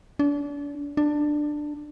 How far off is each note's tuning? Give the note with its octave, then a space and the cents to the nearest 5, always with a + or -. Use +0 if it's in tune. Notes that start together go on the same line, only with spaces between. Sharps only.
D4 -35
D4 +15